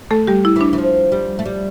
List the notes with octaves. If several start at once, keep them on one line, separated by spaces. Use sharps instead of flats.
A3 A4
G3 G4
E4
E3 D4
E3
F3
G3
A3
G3